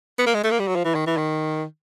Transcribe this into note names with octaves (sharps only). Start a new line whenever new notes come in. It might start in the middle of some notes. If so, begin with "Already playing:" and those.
B3
A#3
G#3
A3
A#3
G3
F#3
F3
E3
D#3
E3
D#3